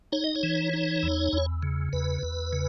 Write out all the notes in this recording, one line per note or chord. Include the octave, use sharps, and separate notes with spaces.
D#4 C#5
D#5
C#5
E3
D#4
E2
E2
C#3
E2 B4
E2
C#3